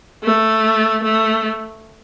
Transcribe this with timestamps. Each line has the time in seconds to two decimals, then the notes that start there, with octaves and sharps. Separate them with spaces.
0.24 A3
1.04 A3